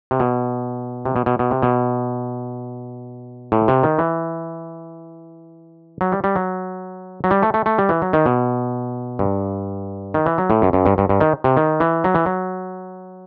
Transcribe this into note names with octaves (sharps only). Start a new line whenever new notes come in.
C3
B2
C3
B2
B2
B2
C3
B2
A2
C3
D#3
E3
F#3
G3
G3
F#3
F#3
G3
A3
A3
A3
G3
E3
F#3
D#3
B2
G2
D#3
E3
F#3
A2
F#2
F#2
G2
G2
G2
D#3
C3
D#3
E3
F#3
E3
F#3